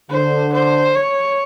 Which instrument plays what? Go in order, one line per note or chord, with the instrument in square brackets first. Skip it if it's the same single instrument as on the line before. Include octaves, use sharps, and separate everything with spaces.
[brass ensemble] D3 [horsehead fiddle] C5
[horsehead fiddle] C5
C#5